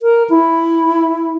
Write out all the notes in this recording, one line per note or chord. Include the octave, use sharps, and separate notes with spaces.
A#4
E4